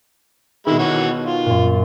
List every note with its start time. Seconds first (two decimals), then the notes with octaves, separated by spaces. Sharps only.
0.67 B2 D#3 G#3 E5 B5
0.79 E3 F#4 C#5
1.26 F4
1.46 F#2 A#2